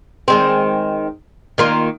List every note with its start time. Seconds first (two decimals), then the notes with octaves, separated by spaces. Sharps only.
0.28 D#3 G#3 C4
1.58 D#3 A#3 F4